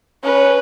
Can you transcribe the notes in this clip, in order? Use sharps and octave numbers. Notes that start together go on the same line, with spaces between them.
C#4 B4